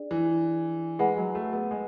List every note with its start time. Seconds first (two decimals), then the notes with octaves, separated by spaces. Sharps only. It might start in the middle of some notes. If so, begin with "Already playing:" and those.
Already playing: D4 G#4 D5
0.11 E3
0.99 G#3 G#4 B4 F#5 B5
1.17 F#3
1.35 A3
1.53 B3
1.71 G#3